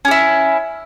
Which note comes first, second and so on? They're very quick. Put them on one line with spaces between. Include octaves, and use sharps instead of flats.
C#4 G4 E4